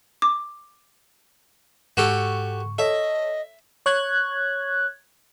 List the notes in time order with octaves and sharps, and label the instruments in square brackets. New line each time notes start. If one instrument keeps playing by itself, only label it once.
[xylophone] D6
[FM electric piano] G#2 C#6 [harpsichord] F#4 G4 A4
[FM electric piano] A4 C#5 [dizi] D#5 [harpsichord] E5
[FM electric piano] C#5 F#6 G#6